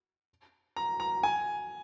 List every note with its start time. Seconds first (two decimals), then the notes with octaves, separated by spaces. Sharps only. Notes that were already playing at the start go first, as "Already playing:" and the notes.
0.76 A#5
1.00 A#5
1.23 G#5